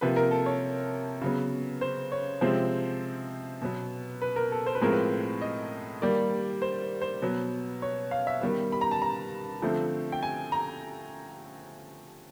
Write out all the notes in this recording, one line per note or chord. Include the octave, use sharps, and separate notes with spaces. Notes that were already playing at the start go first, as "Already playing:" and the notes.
C3 F3 A#3 B4
A#4
A4
C#5
C#3 F#3 B3
C5
C#5
C3 F3 G#3 C4 C5
B2 F#3 B3
B4
A#4
A4
C5
B4
A2 F3 G#3 C4 A#4
B4
D#5
D#3 G3 A#3 D5
C5
C5
B2 F#3 B3
C#5
F5
E5
D#3 G3 B3
B5
A#5
A5
A#5
D3 F3 A3 C4
G5
G#5
A#5